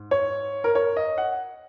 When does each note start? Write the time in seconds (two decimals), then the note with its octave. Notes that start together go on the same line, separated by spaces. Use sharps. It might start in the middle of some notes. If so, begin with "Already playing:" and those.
Already playing: G#2
0.11 C#5
0.64 A#4
0.75 C#5
0.97 D#5
1.18 F#5